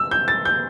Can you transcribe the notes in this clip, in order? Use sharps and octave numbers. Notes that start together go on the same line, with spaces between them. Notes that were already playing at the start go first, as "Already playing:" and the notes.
Already playing: E6
G6
A6
G6